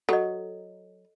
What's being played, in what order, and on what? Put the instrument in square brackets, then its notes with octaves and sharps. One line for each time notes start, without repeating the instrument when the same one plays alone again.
[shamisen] F#3 [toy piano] A4 D#5